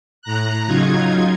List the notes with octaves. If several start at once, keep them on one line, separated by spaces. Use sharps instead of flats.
A2 A#5 F#6
C#3 F#3 D#4 F4 G#6